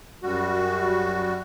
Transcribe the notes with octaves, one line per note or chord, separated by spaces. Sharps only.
F#2 G3 F#4